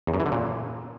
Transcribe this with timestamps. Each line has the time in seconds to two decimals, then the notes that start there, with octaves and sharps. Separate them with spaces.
0.07 E2
0.14 F#2
0.20 E3
0.26 D3
0.32 A#2